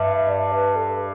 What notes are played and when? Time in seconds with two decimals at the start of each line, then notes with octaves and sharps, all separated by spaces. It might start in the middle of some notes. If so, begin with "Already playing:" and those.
Already playing: G2 E5
0.28 D5
0.52 B4
0.76 A4